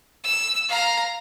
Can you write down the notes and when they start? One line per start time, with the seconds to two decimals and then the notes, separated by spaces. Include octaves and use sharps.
0.24 E6
0.69 F5 A#5